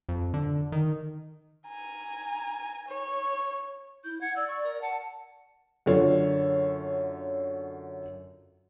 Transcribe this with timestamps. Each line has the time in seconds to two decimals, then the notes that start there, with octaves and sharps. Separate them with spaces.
0.09 F2
0.34 D3
0.72 D#3
1.67 G#5 A#5
2.88 C#5
4.04 E4 G6
4.21 F#5 G#6
4.36 D5 E6
4.47 C#6
4.63 A#4
4.81 F#5 A5
5.86 F#2 D3 F4 A4 C#5